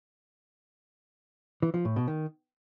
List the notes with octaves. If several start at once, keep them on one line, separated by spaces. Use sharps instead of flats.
E3
F3
A2
B2
D#3